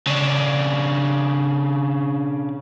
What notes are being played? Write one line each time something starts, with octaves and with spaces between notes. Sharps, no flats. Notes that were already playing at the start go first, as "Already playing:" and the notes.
C#3 D4